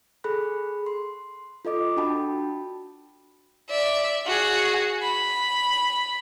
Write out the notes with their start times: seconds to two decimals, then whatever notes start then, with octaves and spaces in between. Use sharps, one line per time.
0.24 G#4 A4 B5 F#6
0.86 C6
1.65 F4 A4 D#5 D6
1.97 D4 F#4 G5 A5 B5
3.70 D5 E5
4.26 F#4 G#4
5.03 B5